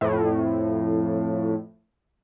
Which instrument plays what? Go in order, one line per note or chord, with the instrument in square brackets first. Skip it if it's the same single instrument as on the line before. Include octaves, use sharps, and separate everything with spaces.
[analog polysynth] F2 A2